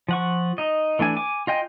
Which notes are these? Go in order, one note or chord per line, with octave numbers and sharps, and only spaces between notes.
F3 F#5 C#6
D#4 D#5
E3 A3 D4 G#5
G#5 D6
F4 D#5 G5 G#5